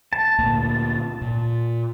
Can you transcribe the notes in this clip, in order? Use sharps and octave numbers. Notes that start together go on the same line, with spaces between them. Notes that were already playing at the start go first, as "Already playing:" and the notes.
A5
D2 A#2 A#3
A#2